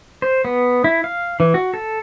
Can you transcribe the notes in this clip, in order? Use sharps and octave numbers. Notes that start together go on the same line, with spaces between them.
C5
B3
E4
F5
E3
F#4
A4